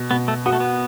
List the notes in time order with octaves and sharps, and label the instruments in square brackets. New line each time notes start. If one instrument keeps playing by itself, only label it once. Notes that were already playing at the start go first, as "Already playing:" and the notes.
Already playing: [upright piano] B2
[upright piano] B2 [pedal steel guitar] B3
[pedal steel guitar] A3
[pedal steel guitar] B3 [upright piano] F#4
[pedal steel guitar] A3
B3